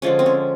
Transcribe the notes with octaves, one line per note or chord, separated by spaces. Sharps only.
D3 F3 G#3 C#4
C4
C#4